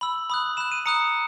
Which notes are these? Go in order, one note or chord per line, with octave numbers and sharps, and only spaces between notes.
B5 E6 F#7
B5 D#6 F#6
B5 F#6 E7
D#7
A#5 D#6 F#6 C#7